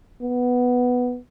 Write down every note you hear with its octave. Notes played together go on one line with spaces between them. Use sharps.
B3